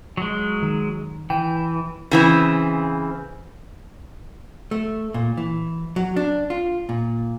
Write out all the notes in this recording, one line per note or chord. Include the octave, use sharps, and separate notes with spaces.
F#3 G#3
D#3
E3 G5
C#3 E3 C4
A3
A#2
E3
F#3
D4
F4
A#2